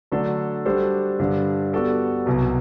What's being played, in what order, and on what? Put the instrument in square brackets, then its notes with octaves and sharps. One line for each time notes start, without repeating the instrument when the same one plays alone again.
[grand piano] D3 F#3 A3 D4 A4
G3 D4 F#4 A4 C5
G2 D3 G3 D4
G3 B3 F#4 A4 D5
C2 B2 F#3